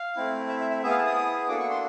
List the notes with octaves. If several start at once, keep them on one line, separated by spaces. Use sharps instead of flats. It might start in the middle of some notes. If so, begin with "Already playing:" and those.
Already playing: F5
A3 C4 E4
E5
E5
E5
B3 E4 G#4 E5
F5
A5
D#6
A#3 D4 F#4 A4 D6
C#6
C6